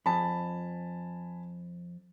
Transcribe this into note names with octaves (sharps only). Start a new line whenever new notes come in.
F2 G#5 A5 B5